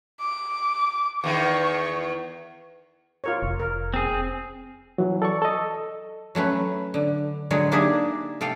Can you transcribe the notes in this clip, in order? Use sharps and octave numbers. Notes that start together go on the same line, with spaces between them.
D6
E2 D#3 C#6
F4 A#4 C#5
F1
A#4
C4 G#4
E3 F#3
A4 D5 C#6
A4 D#5
F#3 A3 C#4 B4
D3
D3 F#3 G#3 C#5
A#3 D4 D#4 G4 G#4 E5
C3 A4 F5 G5